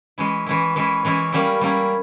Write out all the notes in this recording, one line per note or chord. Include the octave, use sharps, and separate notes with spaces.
E3 G#3 C#4 E4
E3 G#3 C#4 E4
E3 G#3 C#4 E4
E3 G#3 C#4 E4
G3 A#3 C#4 E4
G3 A#3 C#4 E4